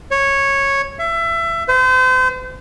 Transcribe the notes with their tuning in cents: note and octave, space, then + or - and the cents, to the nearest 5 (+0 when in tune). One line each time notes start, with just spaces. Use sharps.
C#5 -10
E5 +25
C5 -35